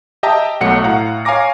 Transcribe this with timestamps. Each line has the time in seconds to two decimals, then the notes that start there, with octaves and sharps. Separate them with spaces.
0.23 G4 D#5 E5 G5 A5 A#5
0.61 B1 F#3 A3 F#5 C#7
0.84 A2 F5 F#5 A#5
1.25 C#5 F5 G#5 A#5 D6 A#6